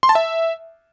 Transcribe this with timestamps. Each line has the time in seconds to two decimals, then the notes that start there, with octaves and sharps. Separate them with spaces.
0.03 C6
0.09 A5
0.15 E5